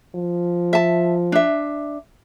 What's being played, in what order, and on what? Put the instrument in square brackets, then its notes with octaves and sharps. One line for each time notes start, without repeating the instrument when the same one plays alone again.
[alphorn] F3
[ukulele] E5 A5
D4 E5